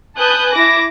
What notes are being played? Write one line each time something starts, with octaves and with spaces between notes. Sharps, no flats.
B4 G#5 A5 D#6 F#6 G6
E4 D6 A#6